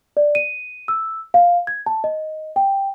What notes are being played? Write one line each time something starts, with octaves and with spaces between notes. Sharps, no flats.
D5
D#7
E6
F5
G#6
A5
D#5
G5